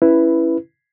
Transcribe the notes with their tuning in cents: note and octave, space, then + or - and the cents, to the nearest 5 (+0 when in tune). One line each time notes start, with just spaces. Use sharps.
C#4 -5 E4 +5 B4 +0